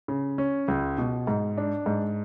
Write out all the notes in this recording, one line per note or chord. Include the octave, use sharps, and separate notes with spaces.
C#3
C#4
C#2
B2
G#2
D4
G#2